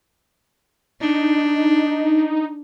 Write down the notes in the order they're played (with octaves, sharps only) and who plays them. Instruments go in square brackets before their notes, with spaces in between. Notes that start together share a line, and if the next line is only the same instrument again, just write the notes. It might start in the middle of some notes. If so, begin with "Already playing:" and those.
[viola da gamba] D4 [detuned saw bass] D#4